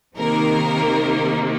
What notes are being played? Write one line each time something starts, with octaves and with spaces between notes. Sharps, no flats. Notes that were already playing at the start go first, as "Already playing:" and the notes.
C3 D#3 A#3 A#4